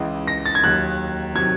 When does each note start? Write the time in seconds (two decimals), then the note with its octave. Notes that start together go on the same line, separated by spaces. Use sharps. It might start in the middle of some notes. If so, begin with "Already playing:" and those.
Already playing: C#2 C#3 E3
0.27 A#6
0.46 A6
0.55 G#6
0.63 D#2 D#3 F#3 F#6
1.35 C3 D#3 F#3 G#6